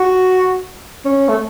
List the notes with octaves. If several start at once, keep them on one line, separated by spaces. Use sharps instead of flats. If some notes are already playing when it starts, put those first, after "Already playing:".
Already playing: F#4
C#4
A3